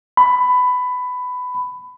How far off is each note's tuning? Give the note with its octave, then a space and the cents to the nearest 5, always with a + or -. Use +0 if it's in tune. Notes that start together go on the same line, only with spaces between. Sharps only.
B5 +15